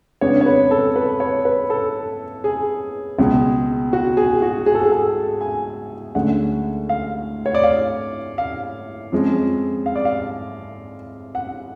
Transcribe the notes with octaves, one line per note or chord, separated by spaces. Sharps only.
F2 C#3 G#3 B3 D4 C#5
C#5
B4
A4
B4
C#5
B4
A4
G#4
C#2 B2 G#3
F#4
G#4
F#4
G#4
A4
G#4
A4
G#5
D2 D3 G#3 C#4 F#5
F5
C#5
D5
F5
F5
F2 F3 G#3 C#4
F5
D5
F5
F#5